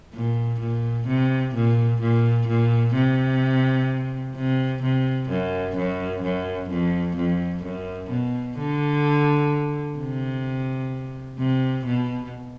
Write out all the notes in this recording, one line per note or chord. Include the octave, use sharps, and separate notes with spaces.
A#2
A#2
C3
A#2
A#2
A#2
C3
C3
C3
F#2
F#2
F#2
F2
F2
F#2
B2
D3
C3
C3
B2